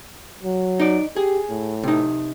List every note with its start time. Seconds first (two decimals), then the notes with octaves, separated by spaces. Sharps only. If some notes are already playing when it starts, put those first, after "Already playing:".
0.43 F#3
0.80 D#4 D5
1.16 G4 G#4
1.50 A2
1.84 C3 D#4